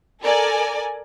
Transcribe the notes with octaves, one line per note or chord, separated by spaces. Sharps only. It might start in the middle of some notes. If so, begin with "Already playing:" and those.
A4 A#4 D5 G#5